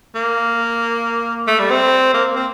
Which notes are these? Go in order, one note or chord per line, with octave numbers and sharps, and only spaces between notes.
A#3
A3
G3
C4
A#3
C4